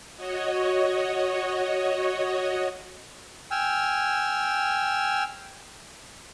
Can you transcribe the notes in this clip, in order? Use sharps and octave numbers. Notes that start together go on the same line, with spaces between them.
F#4 C#5 D#5
G5 G#5 E6 F6